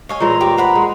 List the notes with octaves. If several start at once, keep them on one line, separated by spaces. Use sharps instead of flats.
C#5 D#5 F5 G#5
A#2 E3 G#3 A#5
G4 C#5
C5 F#5 B5
G#3